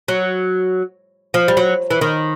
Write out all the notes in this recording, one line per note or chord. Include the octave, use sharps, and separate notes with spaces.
F#3
F3
G3
F#3
E3
D#3